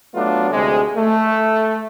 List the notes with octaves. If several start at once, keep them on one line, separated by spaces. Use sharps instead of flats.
F#3 A3 B3 D4 F4
D2 C3 G#3
A3